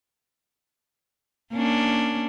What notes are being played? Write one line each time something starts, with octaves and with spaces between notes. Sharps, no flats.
A#3 C#4 D4